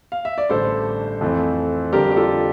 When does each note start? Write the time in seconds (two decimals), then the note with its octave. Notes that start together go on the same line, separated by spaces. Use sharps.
0.12 F5
0.25 E5
0.38 D5
0.50 A1 G2 D3 A4 C5
1.21 F2 E3 A3 C4
1.93 F2 D3 G3 G4 A#4
2.11 G4
2.16 F4 A4